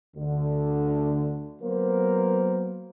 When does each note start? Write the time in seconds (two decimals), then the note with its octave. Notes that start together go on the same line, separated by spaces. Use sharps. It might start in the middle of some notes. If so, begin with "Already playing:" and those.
0.16 D2 D3
1.61 F#3 A#3 B3 A#4 C5